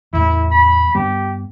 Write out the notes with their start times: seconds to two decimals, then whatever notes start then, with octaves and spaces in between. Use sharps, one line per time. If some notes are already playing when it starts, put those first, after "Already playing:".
0.13 E2 A2 E4
0.51 B5
0.95 G2 G3 B3 G4